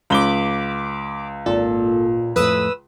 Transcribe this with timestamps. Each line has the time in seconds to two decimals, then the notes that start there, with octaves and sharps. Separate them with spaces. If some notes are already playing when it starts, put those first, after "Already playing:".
0.10 C#2 B5 D6 G7
1.46 G#1 A#2 A4
2.36 F2 A2 B4 D#6 E6